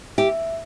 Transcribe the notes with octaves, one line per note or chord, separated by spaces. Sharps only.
G4 E5